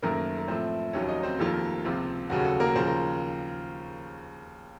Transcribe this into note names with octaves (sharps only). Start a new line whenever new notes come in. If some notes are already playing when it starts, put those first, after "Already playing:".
F#1 F#2 D#3 A3 A#3 A#4
A#4
A2 F3 A3 C4 C5
F1 D#2 D#3 F#3 C#4 C#5
D#4 D#5
C4 C5
F1 F2 D#3 A#3 F4 A4
C#2 C3 F3 C4 F4
F1 D#2 C#3 F#3 F#4
F#4
A4
A#3 A#4
D#2 C#3 F3 C5
A#4